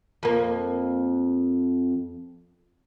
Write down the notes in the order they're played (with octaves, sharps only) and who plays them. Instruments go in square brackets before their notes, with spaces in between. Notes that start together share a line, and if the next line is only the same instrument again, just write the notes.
[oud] F2 A#3